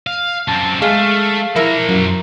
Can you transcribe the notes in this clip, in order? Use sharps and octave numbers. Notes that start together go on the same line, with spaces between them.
F5
F#2 C4 A5
G#3 A3 F5
F3 E4 A#4 A#5
F#2